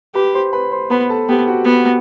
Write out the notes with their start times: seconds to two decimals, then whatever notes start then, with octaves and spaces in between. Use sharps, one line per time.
0.15 G4 B4 B5
0.34 C5 C6
0.53 B4 B5
0.71 C5 C6
0.90 B3 B4 B5
1.09 A4 A5
1.29 B3 G4 G5
1.47 F#4 F#5
1.65 B3